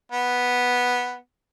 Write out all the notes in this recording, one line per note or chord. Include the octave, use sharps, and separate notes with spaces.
B3